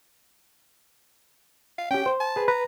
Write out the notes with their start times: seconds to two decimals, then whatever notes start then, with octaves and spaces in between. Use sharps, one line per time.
1.78 F5
1.91 C#4 G4 G5
2.06 C5
2.20 A5
2.36 G#4 B4
2.48 B4 A#5